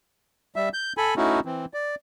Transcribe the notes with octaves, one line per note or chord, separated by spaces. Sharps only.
G3 E5
G6
A4 G#5 B5
A3 C#4 D#4 E4 F#4
E3 C4
D5